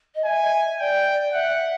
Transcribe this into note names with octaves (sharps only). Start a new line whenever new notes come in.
D#5
E5 G#5
D5 G5
E5 F#5